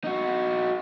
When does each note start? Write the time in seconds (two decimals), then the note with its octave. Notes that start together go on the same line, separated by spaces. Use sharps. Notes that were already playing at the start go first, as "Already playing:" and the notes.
0.04 D#4 F#4